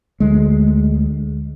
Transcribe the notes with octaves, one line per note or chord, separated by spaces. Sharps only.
D2 G#3